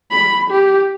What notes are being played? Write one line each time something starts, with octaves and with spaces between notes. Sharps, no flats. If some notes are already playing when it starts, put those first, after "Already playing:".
B5
G4